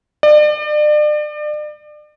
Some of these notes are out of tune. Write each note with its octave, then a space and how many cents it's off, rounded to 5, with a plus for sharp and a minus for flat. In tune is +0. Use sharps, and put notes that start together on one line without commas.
D5 +35